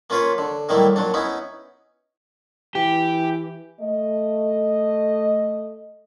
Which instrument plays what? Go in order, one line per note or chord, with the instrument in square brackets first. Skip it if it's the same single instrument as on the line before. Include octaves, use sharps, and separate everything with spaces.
[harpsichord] A#3 C#4 F4 B4 C#5 F5
D3
A2 D#3 F#3 G3 A#3 E4
A#2 F#3 D4
B3 C#4 D#4 E4
[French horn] E3 [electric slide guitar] G4
[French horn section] A3 D#5